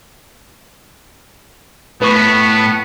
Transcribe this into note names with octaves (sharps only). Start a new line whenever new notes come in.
A2 B3 B4 C#6